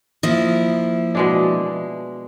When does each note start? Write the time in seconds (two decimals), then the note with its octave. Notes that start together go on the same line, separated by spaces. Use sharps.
0.23 F3 A#3 E4 D#5
1.15 B2 G#3 D4